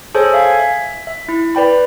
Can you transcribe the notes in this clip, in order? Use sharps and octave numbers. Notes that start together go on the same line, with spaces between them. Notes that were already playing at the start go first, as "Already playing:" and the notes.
G#4 A4 C5 C#5 G#5
E5 F5 G#5 G#6
E5
E5
E4
B4 D5 G5 B5